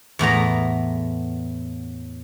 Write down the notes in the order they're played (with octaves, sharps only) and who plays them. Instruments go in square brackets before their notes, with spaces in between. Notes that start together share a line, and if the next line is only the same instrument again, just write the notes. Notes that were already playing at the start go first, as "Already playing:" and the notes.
[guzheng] E2 A2 B3 A#5